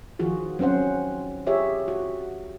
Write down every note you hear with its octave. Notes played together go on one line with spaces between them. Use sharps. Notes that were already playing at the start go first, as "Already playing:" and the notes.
D#3 F3 F4 F#4 G#4
F#3 C4 C#4 C5 F#5
F4 G4 G#4 C#5 E5
F#4